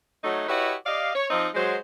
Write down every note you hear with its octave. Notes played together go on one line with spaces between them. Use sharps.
F#3 A3 D#4
E4 F#4 G4 B4 C#5 D#5
G4 D5 D#5 F5
C#5
F3 C4 D#4
F#3 G#3 C5